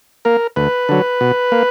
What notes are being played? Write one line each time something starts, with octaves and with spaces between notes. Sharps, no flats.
A#3 A#4
D2 B4
D3 F#3
B2
A#3